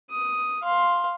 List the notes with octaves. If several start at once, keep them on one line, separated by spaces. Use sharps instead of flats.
D#6
F5 C6